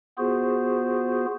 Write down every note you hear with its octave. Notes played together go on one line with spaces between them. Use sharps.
B3 F4 F#4 G#4 C5